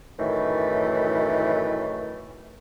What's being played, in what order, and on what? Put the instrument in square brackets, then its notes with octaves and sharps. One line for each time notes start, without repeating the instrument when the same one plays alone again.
[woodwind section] F#2 A2 D#3 E3 A3